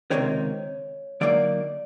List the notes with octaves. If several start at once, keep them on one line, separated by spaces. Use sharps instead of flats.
C#2 C3 D#3 C#5
D3 F#3 A#3 D#4 D5